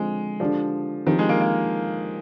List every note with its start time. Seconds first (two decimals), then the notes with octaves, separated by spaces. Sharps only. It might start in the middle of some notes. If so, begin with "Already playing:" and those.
Already playing: D3 F3 G#3 C4 F4 C5
0.40 D3 F3 G#3 D4 G4 D5
1.07 D3 D#3 F3 C4 G4
1.19 G#3
1.29 A#3
1.41 A#3